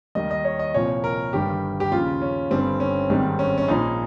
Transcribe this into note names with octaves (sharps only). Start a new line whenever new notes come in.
D#2 D#3 G3 D#5
D#5
C#5
D#5
C2 A#2 F3 C#5
A#4
G1 G2 D#3 G3 G4
G4
D#2 C#3 F3 F4
C#4
G1 G2 G3 C4
C#4
G#1 G#2 D#3 G3 C4
C#4
C#4
A#1 A#2 F3 D#4